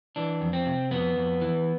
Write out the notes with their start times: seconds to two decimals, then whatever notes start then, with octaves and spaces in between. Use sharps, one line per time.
0.16 E3 D4
0.41 F2
0.53 C4
0.66 C3
0.91 F2 B3
1.16 F2
1.41 E3